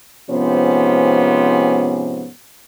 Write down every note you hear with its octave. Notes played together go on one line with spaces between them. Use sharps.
G#2 C3 F3 B3 C#4 C5